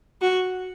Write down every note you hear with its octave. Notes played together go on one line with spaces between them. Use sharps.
F#4